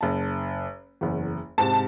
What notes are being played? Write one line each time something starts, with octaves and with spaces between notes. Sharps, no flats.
F#1 A5
F#1 E2
G#2 C3 A5